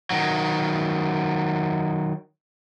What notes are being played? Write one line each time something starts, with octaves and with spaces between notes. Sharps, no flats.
D#3 F#3